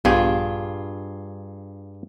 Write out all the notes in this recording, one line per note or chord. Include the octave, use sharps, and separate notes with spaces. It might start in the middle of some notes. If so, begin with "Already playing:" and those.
A#1 G2 B3 F4 G4 G#4